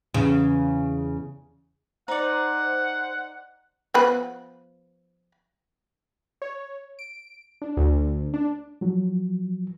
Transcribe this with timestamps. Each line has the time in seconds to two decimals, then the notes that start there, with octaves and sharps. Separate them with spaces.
0.14 E2 C#3
2.08 D#4 C5 D5 F#5
3.94 F3 B3 B4
6.42 C#5
6.99 D7
7.62 D4
7.77 D2
8.34 D4
8.81 F3 F#3